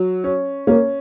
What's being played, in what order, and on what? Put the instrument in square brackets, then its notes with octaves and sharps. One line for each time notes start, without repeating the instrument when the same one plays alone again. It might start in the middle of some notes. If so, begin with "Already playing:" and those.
Already playing: [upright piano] F#3
C#4
[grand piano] A#3 [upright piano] C#4